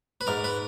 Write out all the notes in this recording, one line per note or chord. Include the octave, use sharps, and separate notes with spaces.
B4
G#2 A#4
B4